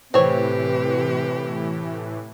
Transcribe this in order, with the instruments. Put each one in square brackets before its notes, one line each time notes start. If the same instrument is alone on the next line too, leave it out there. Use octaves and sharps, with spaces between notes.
[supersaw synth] A2 E3 [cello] C3 G4 [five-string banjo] C4 C#5 [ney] B4